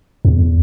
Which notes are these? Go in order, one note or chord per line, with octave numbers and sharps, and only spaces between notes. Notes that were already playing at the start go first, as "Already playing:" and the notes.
E2